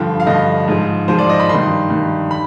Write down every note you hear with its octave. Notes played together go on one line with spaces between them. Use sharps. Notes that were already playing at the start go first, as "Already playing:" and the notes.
Already playing: G2 D3 F3 G5
F5
G2 D3 F3 D#5
G#2 F3
G#2 F3 C5
D5
D#5
B5
D#3 C6
G2
G2 D#3
B5